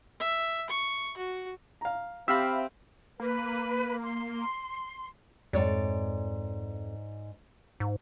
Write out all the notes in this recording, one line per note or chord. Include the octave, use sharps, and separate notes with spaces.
E5
C#6
F#4
F5 A#5
C4 G4 E5 F5 B5
A#3 B4
C6
F2 G#2 C#5 D5
G#2